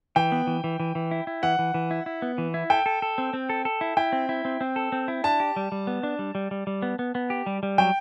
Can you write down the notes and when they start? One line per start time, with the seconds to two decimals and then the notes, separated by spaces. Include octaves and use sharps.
0.16 E3 G5
0.32 B3
0.47 E3
0.64 E3
0.80 E3
0.95 E3
1.11 E4
1.27 E4
1.43 E3 F#5
1.59 E3
1.74 E3
1.91 E4
2.06 E4
2.22 B3
2.38 E3
2.54 E4
2.70 A4 G5
2.86 A4
3.02 A4
3.18 C4
3.33 C4
3.49 A4
3.65 A4
3.81 E4
3.97 E4 G5
4.13 C4
4.29 E4
4.45 C4
4.61 C4
4.76 A4
4.92 C4
5.08 E4
5.24 D4 A5
5.40 G4
5.56 G3
5.72 G3
5.87 B3
6.03 D4
6.19 G3
6.35 G3
6.51 G3
6.67 G3
6.82 B3
6.99 B3
7.15 B3
7.30 G4
7.46 G3
7.63 G3
7.78 F#3 G5